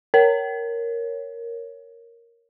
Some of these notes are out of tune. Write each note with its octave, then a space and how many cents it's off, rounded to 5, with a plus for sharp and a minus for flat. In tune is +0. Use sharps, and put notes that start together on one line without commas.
A#4 +0 C#5 +0